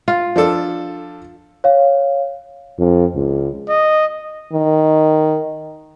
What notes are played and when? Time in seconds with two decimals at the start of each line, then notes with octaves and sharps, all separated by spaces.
0.08 F4
0.36 F3 D4 A4
1.64 C#5 F5
2.79 F2
3.15 C#2
3.69 D#5
4.53 D#3